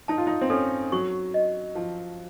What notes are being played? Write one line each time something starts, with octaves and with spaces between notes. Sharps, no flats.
D#4 A5
F4
D#4
C4
C#4 A4
F#3 C#6
D#5
F3 A5